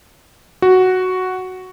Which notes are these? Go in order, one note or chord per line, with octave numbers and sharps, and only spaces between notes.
F#4